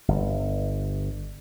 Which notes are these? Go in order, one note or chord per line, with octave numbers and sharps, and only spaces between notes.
G1